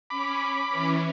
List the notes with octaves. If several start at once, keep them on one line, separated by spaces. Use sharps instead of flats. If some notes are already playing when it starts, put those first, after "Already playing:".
C#4 B5 D6
E3 C#4